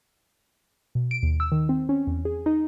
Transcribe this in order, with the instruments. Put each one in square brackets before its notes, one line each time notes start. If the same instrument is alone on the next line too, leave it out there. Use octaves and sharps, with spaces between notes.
[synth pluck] B2
D7
D#2
E6
D#3
C4
C#4
E2
G#4
D#4